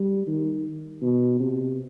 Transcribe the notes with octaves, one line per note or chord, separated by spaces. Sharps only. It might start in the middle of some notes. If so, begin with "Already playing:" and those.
Already playing: G3
D#3
B2
C3